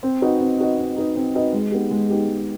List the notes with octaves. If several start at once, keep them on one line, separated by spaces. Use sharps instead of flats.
C4
D#4 F#4 B4 D#5
C4
D#4 F#4 B4 D#5
C4
D#4 F#4 B4 D#5
C4
D#4 F#4 B4 D#5
G#3
B3 D#4 G4
G#3
B3 D#4 G4
G#3